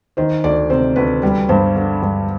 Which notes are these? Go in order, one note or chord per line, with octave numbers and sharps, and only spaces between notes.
D#3 C5
D2 D5
C3 C5
D2 B4
G3 B4
G2 C5
D3
G2